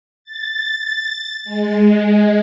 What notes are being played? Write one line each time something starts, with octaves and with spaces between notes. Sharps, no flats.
A6
G#3